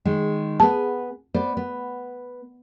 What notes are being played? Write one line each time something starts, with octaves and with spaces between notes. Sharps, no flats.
D#3 G#3
B3 G#4 A5
B3 C5 D5
B3